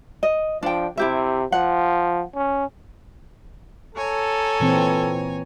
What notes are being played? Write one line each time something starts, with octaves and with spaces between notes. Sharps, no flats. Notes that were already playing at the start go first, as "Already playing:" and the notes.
D#5
F3 D4 G5
C3 E4 G4 E5
F3 F#5
C#4
A4 C#5 G#5 A#5
A#2 E3 C4